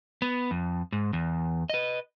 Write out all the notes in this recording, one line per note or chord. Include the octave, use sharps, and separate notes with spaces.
B3
F2
G#2
E2
B4 D#5